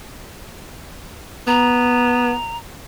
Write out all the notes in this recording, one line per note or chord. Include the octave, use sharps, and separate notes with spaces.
B3 A#5